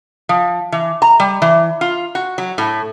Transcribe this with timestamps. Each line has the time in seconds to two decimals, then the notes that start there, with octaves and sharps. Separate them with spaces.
0.29 F3
0.72 E3
1.02 A#5
1.20 G3
1.42 E3
1.81 F4
2.15 F#4
2.38 F#3
2.58 A2